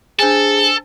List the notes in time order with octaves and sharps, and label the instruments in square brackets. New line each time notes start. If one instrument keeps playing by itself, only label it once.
[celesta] D4 C5 G#5 [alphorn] G#4 [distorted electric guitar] A4